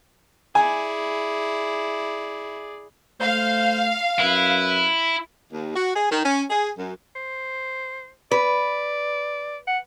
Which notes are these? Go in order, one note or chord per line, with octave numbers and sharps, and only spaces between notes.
E4 G#4 D5 G#5
A3 C5 F5
F#2 E4 B4
D#2
F#4
G#4
D#3
C#4
G#4
F#2
C5
B4 D5
F#5